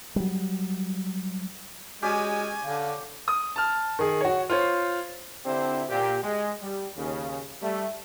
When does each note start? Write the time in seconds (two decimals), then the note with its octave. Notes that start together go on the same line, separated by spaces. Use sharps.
0.16 F#3 G3
2.02 G#3 C#4 F#4 G4 D5 G#5
2.64 D3 F5
3.28 D#6
3.56 A5 F6
3.99 D#3 G#4
4.21 F#4 C#5
4.49 F4 C5 C#5
5.45 D3 C4 D4 E4 G4 C5
5.89 A#2 G4
6.24 G#3
6.62 G3
6.97 D#2 C#3
7.62 G3 A3